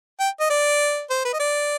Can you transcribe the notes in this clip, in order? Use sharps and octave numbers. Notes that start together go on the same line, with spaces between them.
G5
D#5
D5
C5
B4
D#5
D5